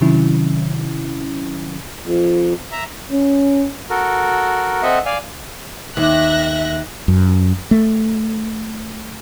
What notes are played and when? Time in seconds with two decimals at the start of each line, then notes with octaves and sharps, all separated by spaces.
0.01 C3 D#3 F#3 C#4 E4
2.03 F2
2.72 E5 A#5
3.12 C#4
3.90 F#4 A4 A#4
4.83 C4 A4 D#5 E5 F#5
5.06 D5 F5 G#5
5.97 D#2 E5 F#6 A#6
7.08 F#2
7.71 A3